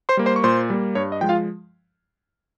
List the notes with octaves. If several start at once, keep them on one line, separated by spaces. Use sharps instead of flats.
C5 C6
G3 A#3
C5 C6
C#6
A#2 C5 C6
G3 A#3
G2 C#5
D#5
F3 G#3 G5
F4 F5